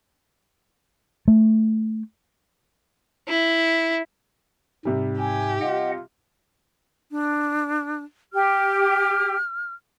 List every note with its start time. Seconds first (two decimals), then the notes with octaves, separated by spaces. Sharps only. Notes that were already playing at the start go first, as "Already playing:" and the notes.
1.28 A3
3.28 E4
4.85 G#2 C3 G3
5.18 G4 G#5
5.61 F4 D#5 F#5
7.11 D4
8.33 G4 F6